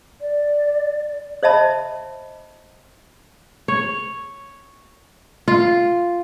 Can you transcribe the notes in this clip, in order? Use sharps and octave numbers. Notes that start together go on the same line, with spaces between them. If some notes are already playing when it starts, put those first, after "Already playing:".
D5
C5 D#5 E5 A5 B5
C#5
F4